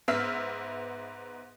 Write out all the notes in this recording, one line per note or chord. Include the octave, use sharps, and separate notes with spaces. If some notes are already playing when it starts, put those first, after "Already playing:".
G#2 B3 E5 E6 F6 B6